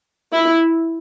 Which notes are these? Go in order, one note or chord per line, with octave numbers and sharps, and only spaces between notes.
E4